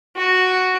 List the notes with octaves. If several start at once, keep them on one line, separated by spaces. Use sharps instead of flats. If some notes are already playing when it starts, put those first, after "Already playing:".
F#4